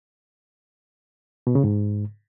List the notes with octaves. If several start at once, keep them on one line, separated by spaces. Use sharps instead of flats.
B2
C#3
G#2